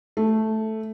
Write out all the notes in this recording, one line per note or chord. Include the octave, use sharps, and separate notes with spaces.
A3